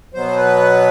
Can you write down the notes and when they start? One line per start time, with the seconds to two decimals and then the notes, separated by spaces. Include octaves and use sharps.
0.13 B2 F#3 B3 C5
0.37 B4